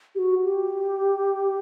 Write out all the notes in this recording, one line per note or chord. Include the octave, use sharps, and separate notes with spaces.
G4
F#4
G4